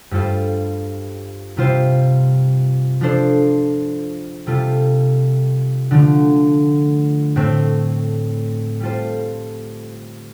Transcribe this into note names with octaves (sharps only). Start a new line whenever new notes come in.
G2 G3 F4 A4 C5
C3 G3 F4 C5
F3 D4 A4 C5
C3 G3 F4 A4
D3 F3 A3
A2 A3 C4
G3 F4 A4 C5